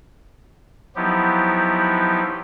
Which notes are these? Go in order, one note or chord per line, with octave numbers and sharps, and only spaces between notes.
F3 F#3 B3 D#4 E4 G4